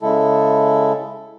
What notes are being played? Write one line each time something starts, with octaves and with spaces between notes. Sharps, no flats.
C#3 G#3 E4 A4